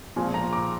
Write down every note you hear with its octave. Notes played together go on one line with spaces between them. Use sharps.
A#2 F3 G#3 G#5
A#5
D6